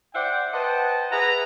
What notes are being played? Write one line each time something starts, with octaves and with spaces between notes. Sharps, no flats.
C5 D5 E5 F#5 G5
B4 C5 D#5 F#5 G5 A5
G#4 B4 E5 F#5 G#5 A#5